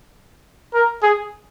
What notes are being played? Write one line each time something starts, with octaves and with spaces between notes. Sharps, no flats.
A#4
G#4